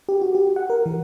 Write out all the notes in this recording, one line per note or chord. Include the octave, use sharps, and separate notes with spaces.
G4
F#4
G4
F#5
A#4
E3